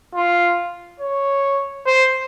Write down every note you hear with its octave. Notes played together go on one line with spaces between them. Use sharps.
F4
C#5
C5